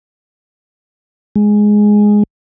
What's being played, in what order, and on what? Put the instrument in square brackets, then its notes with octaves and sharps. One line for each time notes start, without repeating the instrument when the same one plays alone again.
[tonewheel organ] G#3